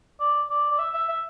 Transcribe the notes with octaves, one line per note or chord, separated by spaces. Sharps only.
D5
D5
D5
E5
E5
E5